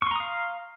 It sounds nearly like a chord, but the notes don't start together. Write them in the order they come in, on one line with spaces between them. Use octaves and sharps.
C#6 C6 A#5 D#6 F5